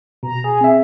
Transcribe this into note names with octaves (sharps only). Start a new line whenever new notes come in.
B2 A#5
G#4
C4 E5